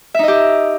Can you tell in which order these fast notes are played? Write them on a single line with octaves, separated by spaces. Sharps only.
E5 D#4 D#5 G4